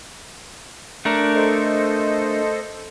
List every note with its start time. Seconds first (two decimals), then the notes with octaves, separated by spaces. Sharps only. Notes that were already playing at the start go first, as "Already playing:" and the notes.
1.05 A3 D4 A#4
1.35 A4 C5 D#5